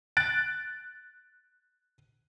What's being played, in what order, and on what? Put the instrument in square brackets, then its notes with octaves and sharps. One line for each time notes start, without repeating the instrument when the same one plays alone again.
[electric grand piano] F#6 A6 D7